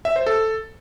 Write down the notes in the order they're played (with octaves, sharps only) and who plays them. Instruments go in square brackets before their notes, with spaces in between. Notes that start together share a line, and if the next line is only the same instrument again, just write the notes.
[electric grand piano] E5
C5
A4